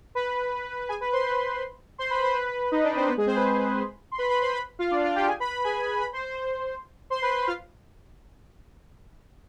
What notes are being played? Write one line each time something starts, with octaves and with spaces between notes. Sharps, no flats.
B4 B5
G#4 G#5
B4 B5
C5 C6
B4 B5
C5 C6
B4 B5
C5 C6
B4 B5
D#4 D#5
D4 D5
C4 C5
B3 B4
G#3 G#4
C4 C5
B4 B5
C5 C6
C6
B4 B5
B4 B5
C5 C6
B4 B5
F4 F5
D4 D5
F4 F5
G4 G5
G#4 G#5
B4 B5
B4 B5
G#4 G#5
B4 B5
C5 C6
C5 C6
C5 C6
B4 B5
F4 F5